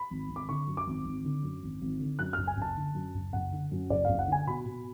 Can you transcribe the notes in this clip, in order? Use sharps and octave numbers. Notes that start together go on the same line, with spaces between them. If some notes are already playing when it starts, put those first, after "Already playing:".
Already playing: B5
G#1
G#1
D6
D3 C#6
F#2
D6
G#1
G#1
D3
F#2
G#1
G#1
D3
F#2 F#6
F#1 F6
G#5
F#1 A5
D3
F#2
F#1
F#1 F#5
D3
F#2
F#1 D5
F#1 F5
F#5
D3 G#5
B2 B5
B2